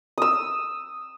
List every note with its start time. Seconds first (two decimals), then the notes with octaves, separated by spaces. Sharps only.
0.18 D#6 E6